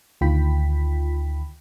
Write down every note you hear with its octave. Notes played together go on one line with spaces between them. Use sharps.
D2 D#3 F4 G5 B5 B6